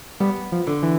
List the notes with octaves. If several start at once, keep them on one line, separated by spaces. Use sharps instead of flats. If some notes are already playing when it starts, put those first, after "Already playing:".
G3 B3
F3
D3
E3